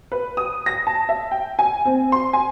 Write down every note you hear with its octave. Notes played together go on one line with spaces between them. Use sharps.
B4
D#6
A#6
A5
E5
G5
G#5
C4
C6
G#5